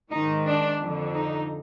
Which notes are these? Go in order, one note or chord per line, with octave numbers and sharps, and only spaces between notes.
G#2 D#3 D#4
D4
F2 D3
D#4